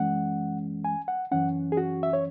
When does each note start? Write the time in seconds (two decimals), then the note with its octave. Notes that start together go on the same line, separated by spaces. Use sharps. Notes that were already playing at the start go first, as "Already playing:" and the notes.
Already playing: F#2 E3 G#3 C#4 F#5
0.85 G#5
1.08 F#5
1.32 F#2 E3 C#4 F#5
1.72 G#4
1.77 F#4
2.03 E5
2.13 C#5